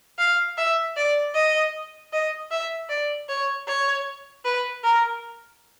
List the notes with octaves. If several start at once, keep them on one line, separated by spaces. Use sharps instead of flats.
F5
E5
D5
D#5
D#5
E5
D5
C#5
C#5
B4
A#4